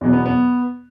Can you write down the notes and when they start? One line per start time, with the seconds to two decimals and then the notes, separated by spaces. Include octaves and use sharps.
0.01 E2 B2 F#3
0.13 B3
0.26 B3